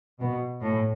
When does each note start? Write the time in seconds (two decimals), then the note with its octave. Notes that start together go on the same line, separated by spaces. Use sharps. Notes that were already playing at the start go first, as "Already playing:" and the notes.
0.20 B2
0.62 A2